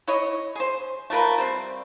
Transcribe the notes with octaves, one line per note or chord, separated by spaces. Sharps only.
E4 C#5 D#5
G#4 C5
A3 F4 A#4 B4
G3 C4